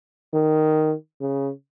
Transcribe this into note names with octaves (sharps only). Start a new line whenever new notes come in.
D#3
C#3